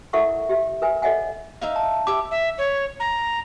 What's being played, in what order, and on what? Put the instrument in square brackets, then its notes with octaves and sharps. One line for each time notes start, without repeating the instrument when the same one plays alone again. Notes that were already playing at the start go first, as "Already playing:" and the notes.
[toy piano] E4 A4 A#4 E5 F#5 C#6
G4 E5
A#4 B4 E5 G#5
A4 C#5 D#5 E5 F#5 G#5
[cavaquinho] D#4 E5 F5
[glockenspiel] A5
[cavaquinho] G4 E5 [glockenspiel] D6
[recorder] E5
C#5
A#5